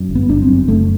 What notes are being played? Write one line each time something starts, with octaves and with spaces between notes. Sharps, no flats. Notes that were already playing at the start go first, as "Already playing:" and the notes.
Already playing: F#2
G1
B3
G1 D4
C4
F#2
F#1 A3